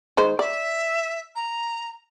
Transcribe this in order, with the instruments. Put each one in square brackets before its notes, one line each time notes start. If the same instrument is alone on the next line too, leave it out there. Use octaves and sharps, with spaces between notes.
[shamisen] D#3 G#3 C5
[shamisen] D5 [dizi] E5
[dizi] A#5